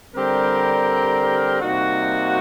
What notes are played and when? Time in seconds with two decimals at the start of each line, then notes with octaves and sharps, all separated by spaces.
0.15 D3 G3 C4 G4 A#4
1.61 C3 G3 A#3 D#4 F#4